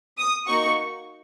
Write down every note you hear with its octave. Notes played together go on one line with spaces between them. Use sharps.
D#6
A#3 D#4 F#4 C#6